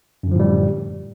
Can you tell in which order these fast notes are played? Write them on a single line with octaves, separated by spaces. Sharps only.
F#2 D3 F3 A2 G3